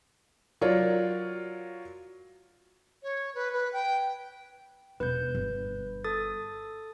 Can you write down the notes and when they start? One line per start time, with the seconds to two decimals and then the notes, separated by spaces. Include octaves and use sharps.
0.61 F#3 F4 A#4 C#5 D5
3.03 C#5
3.35 B4
3.53 B4
3.73 G5
5.00 E1 B2 B4 G6
5.35 G1
6.04 A4 D#6 A6